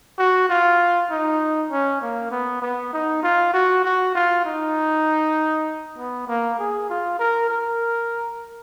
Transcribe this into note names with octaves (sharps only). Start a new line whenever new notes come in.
F#4
F4
D#4
C#4
A#3
B3
B3
D#4
F4
F#4
F#4
F4
D#4
B3
A#3
G#4
F4
A#4
A#4